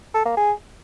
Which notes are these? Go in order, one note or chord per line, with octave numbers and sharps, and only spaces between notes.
A4
A#3
G#4